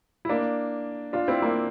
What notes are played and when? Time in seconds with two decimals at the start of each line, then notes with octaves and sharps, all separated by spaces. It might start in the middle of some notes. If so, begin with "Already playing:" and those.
0.25 E4
0.29 A#3 D4
1.13 D4 F4
1.28 C4 E4
1.42 A#3 D4